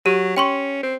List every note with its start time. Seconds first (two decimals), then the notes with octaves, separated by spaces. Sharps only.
0.06 F#3 G4
0.37 C#4 G5 C6 C#6
0.83 C4